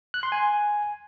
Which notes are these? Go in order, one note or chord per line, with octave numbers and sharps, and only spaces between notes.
F#6
C6
G#5